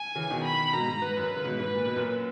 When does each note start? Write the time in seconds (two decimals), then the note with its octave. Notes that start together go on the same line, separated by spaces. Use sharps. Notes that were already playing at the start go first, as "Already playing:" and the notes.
Already playing: G#5
0.15 C#3 E3
0.30 B2 D#3
0.44 B5
0.73 G#2 B2 A#5
0.88 G#2
1.02 G#2 B4
1.17 F#2
1.36 C#3
1.45 G#2 B2
1.59 G#2 B4
1.74 A#2
1.86 B2
1.96 F#2 A#2